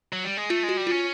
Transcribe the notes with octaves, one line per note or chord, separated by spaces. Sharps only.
F#3
G3
G#3
A3 F4
G#3
F#4
G3
C#4 F4